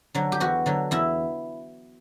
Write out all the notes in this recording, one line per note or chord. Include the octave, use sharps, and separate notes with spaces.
D3 F#3
G4
E2 F#4
D3 F#3
E2 E4